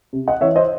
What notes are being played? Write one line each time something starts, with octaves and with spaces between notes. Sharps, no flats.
C3
D#5 F#5
E3 C#5 E5
C5 D#5